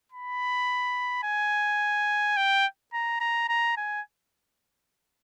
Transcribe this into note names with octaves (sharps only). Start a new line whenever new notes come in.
B5
G#5
G5
A#5
A#5
A#5
G#5